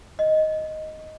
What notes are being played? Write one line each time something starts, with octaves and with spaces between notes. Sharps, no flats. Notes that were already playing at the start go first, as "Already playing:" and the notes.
D#5